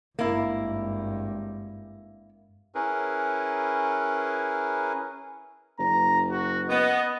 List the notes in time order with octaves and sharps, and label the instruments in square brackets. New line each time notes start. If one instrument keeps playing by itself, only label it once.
[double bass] G#1 G2 [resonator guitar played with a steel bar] A#3 E4
[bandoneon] C#4 E4 G#4 A#4 B4
[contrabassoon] F#1 [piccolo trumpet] A#5
[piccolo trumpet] F#4
[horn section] B3 [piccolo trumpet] D#5